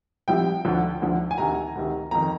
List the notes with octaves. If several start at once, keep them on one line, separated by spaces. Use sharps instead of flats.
C2 C3 F3 G5
D2 D3 F3
D2 D3 F3
G#5
D2 C3 D#3 A#5
D2 C3 D#3
F2 D#3 A#5